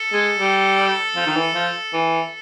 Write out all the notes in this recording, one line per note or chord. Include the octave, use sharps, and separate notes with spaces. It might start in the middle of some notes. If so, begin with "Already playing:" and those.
Already playing: A4
G#3
G3
F3
D#3
E3
F3
E3